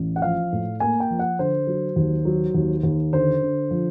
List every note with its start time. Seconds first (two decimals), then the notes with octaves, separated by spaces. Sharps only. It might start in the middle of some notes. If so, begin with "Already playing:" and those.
Already playing: A1
0.16 F#5
0.22 F3 F5
0.52 A2
0.80 A#3 G#5
1.00 G5
1.10 F3
1.19 F#5
1.39 D3 C5
1.67 F#3
1.96 D#2
2.25 F#3
2.54 D#2
2.83 D#2
3.12 D3 C5
3.42 D3
3.71 F3